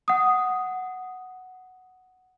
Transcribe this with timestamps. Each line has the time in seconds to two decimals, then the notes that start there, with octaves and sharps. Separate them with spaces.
0.08 F#5 D#6